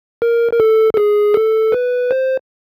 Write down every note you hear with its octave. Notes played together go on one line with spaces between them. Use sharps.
A#4
A#4
A4
A4
G#4
A4
B4
C5